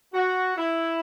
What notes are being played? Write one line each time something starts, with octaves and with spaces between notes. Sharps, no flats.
F#4
E4